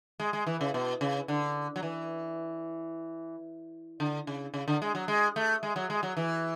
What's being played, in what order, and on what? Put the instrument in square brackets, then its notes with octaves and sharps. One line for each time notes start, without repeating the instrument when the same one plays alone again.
[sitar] G#3
G#3
E3
C#3
B2
C#3
D3
F#3
E3
D3
C#3
C#3
D3
G#3
F#3
G#3
A3
G#3
F#3
G#3
F#3
E3